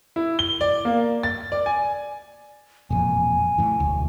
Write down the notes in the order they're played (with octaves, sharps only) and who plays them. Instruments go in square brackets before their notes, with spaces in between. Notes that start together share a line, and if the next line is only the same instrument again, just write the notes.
[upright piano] E4
G7
D5
A#3
A6
D5
G#5
[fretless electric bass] E1 F2 A#2 [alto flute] G#5
[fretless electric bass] A2 E3
E1 D2